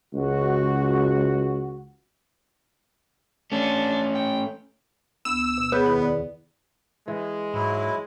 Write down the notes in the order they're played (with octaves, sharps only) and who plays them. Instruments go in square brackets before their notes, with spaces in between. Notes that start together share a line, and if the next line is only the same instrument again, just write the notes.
[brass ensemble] C#2 F#4
[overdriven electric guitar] A3 C#4 [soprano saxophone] D4
[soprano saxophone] G5
[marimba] D2 B3 [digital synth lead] E6
[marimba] B2
[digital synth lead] B3 [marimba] G#4 C#5 G6
[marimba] E2 D#3 E4
D5
[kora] E3 [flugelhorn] G#3
[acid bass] G#2 [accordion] F#3 E4